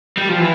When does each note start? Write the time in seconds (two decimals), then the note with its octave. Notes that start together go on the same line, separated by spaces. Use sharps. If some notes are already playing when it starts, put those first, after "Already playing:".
0.17 G3
0.29 F3
0.38 E3